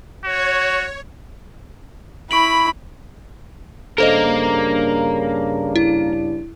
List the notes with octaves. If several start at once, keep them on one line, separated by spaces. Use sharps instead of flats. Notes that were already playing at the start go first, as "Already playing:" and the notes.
F#4 C#5
E4 B5 C#6 D7 F#7
G2 C#3 A#3 D4 A4 A#4 C5 D#5
E4